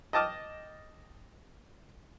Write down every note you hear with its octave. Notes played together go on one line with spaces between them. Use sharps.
D#5 G5 A5 D6 D#6 F6